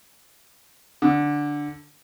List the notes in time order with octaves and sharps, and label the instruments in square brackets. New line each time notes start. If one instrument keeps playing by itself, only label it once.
[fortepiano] D3